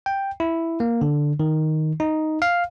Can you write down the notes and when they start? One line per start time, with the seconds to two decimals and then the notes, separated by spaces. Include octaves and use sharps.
0.06 G5
0.40 E4
0.80 A#3
1.01 D3
1.40 D#3
2.00 D#4
2.42 F5